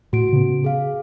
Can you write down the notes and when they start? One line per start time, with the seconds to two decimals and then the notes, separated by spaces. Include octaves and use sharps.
0.13 A2 F#4 D7
0.33 C#3 B3
0.64 G#4 F5